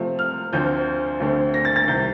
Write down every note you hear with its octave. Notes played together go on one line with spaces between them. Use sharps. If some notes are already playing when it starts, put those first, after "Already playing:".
Already playing: C3 F3 A3 C4
F6
D2 D3 F3 C4 G6
D2 D3 A3 C4
A#6
A6
A6
C2 C3 D#3 G6